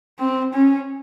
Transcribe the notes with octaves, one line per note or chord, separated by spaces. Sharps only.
C4
C#4